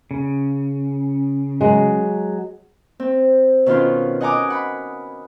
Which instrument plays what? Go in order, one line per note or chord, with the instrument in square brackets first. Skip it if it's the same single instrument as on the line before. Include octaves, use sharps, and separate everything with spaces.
[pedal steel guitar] C#3
[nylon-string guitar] F#3 G#3
[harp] C4
B2 D#3 C#4 F4 C6
D#5 F#5 G#5 A#5 D6 D#6
F#5 B5